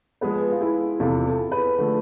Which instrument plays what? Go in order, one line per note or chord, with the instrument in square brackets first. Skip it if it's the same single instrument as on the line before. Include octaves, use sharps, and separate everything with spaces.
[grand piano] F3 G#3 B3 [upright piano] G#4 B4
[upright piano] F4
E4 G#4
[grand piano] E2 C3 F3 [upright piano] F4 A4
[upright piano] F4 A4
G#4 B4
[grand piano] D3 F3 A3